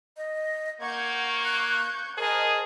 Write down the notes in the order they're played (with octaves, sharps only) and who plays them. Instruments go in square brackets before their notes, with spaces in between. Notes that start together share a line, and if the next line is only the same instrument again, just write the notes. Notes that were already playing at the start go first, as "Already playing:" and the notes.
[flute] D#5
[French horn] A#3 [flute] F#5 [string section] C#6 G6 G#6
[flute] F#6
[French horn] G#4 [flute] A#4 [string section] C5 D#5 A5